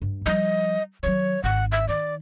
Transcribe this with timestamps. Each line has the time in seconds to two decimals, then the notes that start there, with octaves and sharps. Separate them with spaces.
0.02 G2
0.26 F3 G3 D#5
1.03 D#3 F#3 C#5
1.44 G#1 F#5
1.72 E5
1.88 D#3 D5